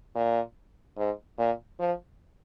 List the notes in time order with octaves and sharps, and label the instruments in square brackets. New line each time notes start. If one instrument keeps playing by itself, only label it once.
[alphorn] A#2
G#2
A#2
F3